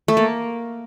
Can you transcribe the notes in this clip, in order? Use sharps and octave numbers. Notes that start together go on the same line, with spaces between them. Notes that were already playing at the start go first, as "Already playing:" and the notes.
A3
A#3